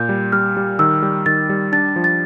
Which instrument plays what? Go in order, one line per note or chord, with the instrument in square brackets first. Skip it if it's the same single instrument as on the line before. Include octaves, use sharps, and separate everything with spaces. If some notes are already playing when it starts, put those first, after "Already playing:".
Already playing: [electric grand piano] A#2 [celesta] G6
[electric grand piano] G3
[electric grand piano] G3 [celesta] F6
[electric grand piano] G3
[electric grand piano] D#3 [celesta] E6
[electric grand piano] G3
[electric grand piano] D#3 [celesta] A6
[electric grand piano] G3
[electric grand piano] D4 [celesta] A6
[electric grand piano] F3
[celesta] A6